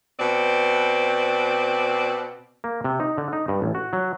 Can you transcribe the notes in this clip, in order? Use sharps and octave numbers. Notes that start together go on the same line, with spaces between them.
B2 C4 D5
A#3
C3
D#4
D3
D#4
G2
A1
F#4
F#3